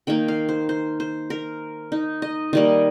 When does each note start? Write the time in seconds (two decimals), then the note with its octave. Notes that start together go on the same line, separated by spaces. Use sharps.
0.07 D#3 A#3 G5
0.28 F5
0.49 C5
0.69 C5
1.00 C5
1.30 A#4
1.92 D#4
2.22 D#5
2.53 D#3 G3 A#3 D#5